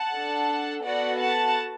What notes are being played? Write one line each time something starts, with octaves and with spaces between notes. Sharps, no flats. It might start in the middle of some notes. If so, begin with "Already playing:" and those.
Already playing: F#5 A5
D4 A4
B3 F#4 A4 D5 F#5
F#5 A5